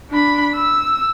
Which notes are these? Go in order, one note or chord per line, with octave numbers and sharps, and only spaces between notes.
D4 B5
E6